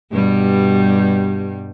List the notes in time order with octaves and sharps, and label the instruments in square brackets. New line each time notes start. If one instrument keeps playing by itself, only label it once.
[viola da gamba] G2 B2 G3